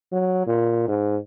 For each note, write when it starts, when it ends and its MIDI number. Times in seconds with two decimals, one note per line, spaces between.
0.12 0.45 54
0.47 0.87 46
0.88 1.16 44